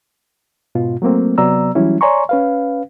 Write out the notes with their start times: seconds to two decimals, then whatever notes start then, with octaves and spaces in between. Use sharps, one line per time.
0.75 G#2 B2 F4
1.02 F#3 A3 A#3 C4
1.38 C3 F#3 B3 D5 A#5 E6
1.75 E3 F#3 G3 C#4 E4
2.01 C#5 D5 G#5 A#5 C6 C#6
2.29 C#4 B4 F5